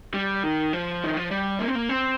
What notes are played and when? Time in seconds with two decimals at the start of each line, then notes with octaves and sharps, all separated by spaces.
0.14 G3
0.43 D#3
0.73 F3
1.04 D#3
1.17 F3
1.31 G3
1.59 A#3
1.68 C4
1.75 A#3
1.89 C4